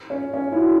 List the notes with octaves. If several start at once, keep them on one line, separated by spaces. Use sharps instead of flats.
C#4
C#4
E4
F#4